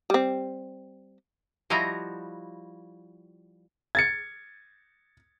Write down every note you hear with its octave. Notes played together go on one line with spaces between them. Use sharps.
G3 C4
F3 G3 E4 F#4 D#5 A#5
G#6 A6 C#7